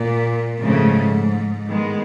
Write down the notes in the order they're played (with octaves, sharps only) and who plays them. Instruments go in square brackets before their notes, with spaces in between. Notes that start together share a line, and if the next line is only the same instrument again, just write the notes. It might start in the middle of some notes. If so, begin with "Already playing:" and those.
Already playing: [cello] A#2
[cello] G#2 [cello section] C#3 F3 A3
[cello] A2 [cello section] D#3 G#3 B3